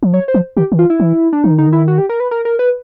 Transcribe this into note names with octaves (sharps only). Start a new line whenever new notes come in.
F3
F#3 C#5
C5
F3
D#3 G4
D#3
E3 F4
E4
E3
D4
E3 D#4
D#3
D3 D#4
D#3
E4
F#4
G4
A#4
B4
A#4
A#4
B4